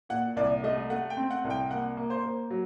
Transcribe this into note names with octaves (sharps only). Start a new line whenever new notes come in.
A#2 F#5
C2 D5
A3 D#5
A3 F#5
G5
C4
F#5
C2
G5
A#3 F#5
A#3
C5
A#3
F#3